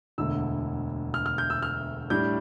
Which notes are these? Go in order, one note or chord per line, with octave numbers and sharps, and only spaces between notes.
E1 D2 D3 E6
F6
F6
G6
E6
F6
A2 G3 D4 G6